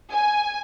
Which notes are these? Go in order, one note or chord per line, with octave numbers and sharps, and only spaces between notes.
G#5